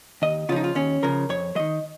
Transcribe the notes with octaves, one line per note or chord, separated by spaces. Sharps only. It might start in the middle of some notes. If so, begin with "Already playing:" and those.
D#2 D#5
C#3 F3 D#4 F4
F4
D#2 C#4
C#3 F3 A#4
F2 C#5
D#3 F#3 D#5